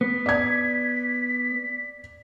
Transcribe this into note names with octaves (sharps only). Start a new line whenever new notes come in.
B3 B6
D5 G#6